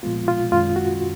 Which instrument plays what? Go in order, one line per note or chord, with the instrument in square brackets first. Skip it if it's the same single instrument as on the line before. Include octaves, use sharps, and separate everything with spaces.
[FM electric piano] A#2 F3 G#3 B3 [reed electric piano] F4
[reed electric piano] F4
[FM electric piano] F#2 D#3 G#3 C#4 [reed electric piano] F4
[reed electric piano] F#4